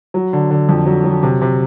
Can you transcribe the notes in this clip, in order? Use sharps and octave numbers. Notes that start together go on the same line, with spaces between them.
F#3
D3
D3
F2
F#3
F#3
C3
C3